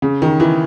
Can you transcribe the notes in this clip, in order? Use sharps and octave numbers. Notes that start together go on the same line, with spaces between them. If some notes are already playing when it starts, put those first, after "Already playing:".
C#3
D#3
E3